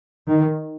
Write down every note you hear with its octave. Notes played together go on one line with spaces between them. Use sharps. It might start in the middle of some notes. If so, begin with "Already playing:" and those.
D#3